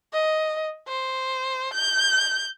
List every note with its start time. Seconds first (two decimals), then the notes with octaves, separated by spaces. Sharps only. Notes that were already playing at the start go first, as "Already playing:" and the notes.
0.13 D#5
0.88 C5
1.73 G6